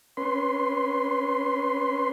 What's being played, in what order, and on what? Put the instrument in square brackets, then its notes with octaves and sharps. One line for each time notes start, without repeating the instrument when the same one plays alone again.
[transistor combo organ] C#4 B4 C6